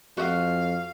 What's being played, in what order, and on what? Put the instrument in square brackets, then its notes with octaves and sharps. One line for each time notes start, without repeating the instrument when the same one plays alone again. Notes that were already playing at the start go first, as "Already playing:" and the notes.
[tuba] F2 [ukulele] F#4 [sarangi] F5